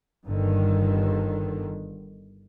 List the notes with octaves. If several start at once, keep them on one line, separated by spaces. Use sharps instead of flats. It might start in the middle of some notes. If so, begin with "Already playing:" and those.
G1 G2 D3 D#3